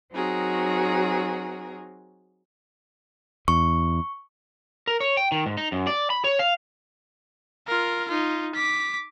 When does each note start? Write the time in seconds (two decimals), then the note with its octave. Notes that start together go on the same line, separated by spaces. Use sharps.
0.12 F#3 C4 D#4 F#4 G#4 A#4
3.48 E2 C#6
4.87 A#4
5.00 C#5
5.17 G5
5.32 D#3
5.46 G#2
5.57 D#4
5.72 F#2
5.87 D5
6.10 B5
6.24 C#5
6.39 F5
7.67 F4 A#4
8.08 D#4 F4
8.55 D6 B6